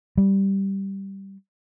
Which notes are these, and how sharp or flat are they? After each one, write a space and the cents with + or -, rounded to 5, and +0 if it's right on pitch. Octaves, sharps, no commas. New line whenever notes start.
G3 -5